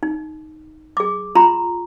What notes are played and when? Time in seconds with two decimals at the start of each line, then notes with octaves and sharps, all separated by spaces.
0.03 D#4
0.97 G#4 D6
1.35 F4 A#5 C6